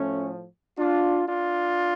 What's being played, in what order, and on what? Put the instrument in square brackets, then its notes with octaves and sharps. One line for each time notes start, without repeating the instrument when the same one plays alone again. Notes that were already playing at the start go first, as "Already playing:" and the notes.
Already playing: [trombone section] A2 F3 A3 C#4
D4 F4
D4 F4